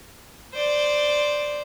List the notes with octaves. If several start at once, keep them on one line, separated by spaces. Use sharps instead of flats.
C5 D5